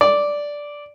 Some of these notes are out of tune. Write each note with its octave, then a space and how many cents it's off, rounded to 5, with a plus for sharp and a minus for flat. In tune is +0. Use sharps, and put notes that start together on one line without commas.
D5 -5